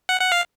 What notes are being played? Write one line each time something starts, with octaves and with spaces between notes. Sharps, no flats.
F#5
F#5
F5